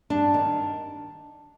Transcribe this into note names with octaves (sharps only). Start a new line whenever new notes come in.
G2 D4
D#3